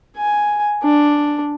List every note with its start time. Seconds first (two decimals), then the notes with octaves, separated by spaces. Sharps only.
0.17 G#5
0.84 D4